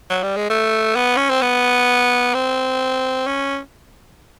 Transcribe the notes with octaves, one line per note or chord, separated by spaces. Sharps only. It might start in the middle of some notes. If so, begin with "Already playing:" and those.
F#3
G3
G#3
A3
B3
C#4
C4
B3
C4
C#4